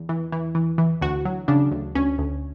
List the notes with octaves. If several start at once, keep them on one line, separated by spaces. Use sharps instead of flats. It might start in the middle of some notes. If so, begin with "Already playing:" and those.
Already playing: E2
E3
E3
E3
E3
D2 F#4
F#3
C#3 D4
D2
D2 C#4
D2